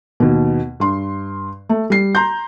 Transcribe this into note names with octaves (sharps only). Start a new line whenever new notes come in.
D#2 B2
G2 C6
A3
G3 C7
A#5 C6 G6